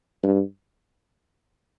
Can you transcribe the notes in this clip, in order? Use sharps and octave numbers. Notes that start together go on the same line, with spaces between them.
G2